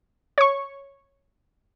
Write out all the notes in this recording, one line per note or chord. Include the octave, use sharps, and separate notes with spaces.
C#5 C#6